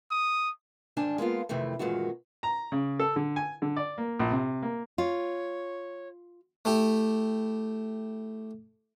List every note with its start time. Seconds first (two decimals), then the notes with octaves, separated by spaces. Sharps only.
0.11 D#6
0.97 D2 G#2 D#3 D4 G#5 A5
1.18 G#3 A#3 B3 F4
1.49 F2 C3 D#3 E3 A3
1.79 F#2 A#2 D#3 E3 G#3 F#4
2.43 A#5
2.72 C#3
2.99 A4
3.16 D3
3.36 G#5
3.62 D3
3.76 D5
3.98 A#3
4.19 A#1
4.31 C3
4.62 A#3
4.98 F4 C#5
6.65 A3 E4 G4